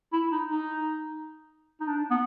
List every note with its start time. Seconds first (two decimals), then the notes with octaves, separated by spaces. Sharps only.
0.12 E4
0.32 D#4
0.51 D#4
1.80 D#4
1.87 D4
2.11 B3